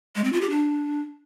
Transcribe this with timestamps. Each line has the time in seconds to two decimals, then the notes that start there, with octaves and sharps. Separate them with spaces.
0.15 G#3
0.24 C4
0.33 F4
0.41 G4
0.50 D4